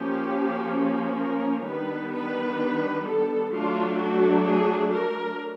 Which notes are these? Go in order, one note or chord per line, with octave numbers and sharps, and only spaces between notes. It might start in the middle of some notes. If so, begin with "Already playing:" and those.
Already playing: F3 A#3 C#4 G4
A#4
D#3 G3 B3 D4 B4
B4
A4
F#3 A3 D4 F4
F#4
G#4
A#4